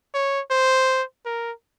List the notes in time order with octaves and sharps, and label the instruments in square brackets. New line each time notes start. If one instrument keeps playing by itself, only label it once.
[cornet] C#5
C5
A#4